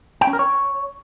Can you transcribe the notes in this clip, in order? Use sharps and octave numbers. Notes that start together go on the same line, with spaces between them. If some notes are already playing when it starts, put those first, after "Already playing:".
G5
C#4
A#4
C#5